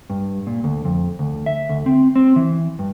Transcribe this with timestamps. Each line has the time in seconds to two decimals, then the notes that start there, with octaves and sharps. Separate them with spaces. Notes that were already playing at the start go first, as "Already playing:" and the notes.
0.10 G2
0.47 A#2
0.64 D2
0.85 F2
1.19 D2
1.46 E5
1.69 D2
1.86 C4
2.16 C4
2.36 E3
2.79 G2